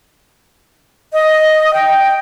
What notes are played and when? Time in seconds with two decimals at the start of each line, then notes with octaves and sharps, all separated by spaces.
1.13 D#5
1.74 G5